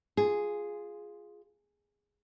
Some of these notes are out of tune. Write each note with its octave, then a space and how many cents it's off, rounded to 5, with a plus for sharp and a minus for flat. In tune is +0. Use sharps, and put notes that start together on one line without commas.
F4 +0 G#4 +0